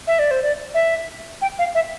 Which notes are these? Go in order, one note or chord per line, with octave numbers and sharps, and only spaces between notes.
E5
D5
C5
D5
E5
G5
F5
E5